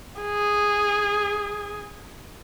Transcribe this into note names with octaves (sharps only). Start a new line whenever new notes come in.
G#4